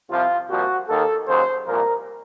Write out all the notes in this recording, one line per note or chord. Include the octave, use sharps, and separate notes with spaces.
C2 C3 F3 C4 F4
C2 A#2 F3 F#4
D#2 D#3 A#3 A4
D#2 C#3 F#3 C5
C2 A#2 F3 A#4